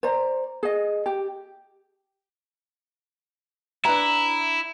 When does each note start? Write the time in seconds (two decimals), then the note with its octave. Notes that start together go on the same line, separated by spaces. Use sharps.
0.03 C5 D5 A#5
0.63 G#4 D#5
1.06 G4
3.85 D4 E4 B4 A#5